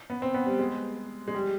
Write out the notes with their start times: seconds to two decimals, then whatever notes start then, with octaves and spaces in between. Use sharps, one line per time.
0.10 B3
0.22 C4
0.34 B3
0.46 G3
0.59 G#3
1.28 G#3
1.35 G3